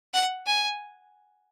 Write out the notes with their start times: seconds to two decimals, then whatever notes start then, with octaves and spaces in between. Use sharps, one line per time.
0.14 F#5
0.47 G#5